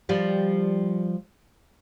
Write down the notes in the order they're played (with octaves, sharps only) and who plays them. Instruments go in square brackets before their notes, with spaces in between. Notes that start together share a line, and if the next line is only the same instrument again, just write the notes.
[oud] F3 G3